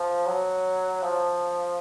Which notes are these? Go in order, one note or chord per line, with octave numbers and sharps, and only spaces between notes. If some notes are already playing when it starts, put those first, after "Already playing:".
Already playing: F3
F#3
F3